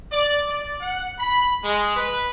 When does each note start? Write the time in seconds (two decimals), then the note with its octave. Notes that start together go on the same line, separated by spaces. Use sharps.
0.11 D5
0.49 D5
0.81 F#5
1.19 B5
1.62 G#3
1.96 B4